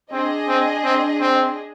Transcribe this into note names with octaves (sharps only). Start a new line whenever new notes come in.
C4 D4 G#4 D#5
C4
C4
C4